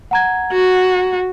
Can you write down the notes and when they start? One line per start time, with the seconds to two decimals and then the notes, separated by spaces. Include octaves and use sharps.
0.11 F#5 A#5 G#6
0.52 F#4